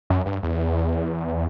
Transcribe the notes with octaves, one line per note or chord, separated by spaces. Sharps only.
F#2
G2
E2